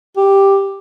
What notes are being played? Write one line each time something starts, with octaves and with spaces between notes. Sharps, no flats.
G4